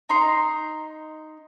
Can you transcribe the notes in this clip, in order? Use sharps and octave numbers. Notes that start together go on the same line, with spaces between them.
D#4 A#5 C6